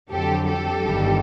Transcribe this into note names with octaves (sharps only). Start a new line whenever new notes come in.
F2 D3 F#3 G4 A4
G4 A4
G1 G2 D#3 G3